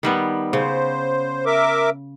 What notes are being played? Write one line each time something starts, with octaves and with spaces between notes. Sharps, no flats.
D#3 G3 B3
C#3 C5
A#4 E5 D6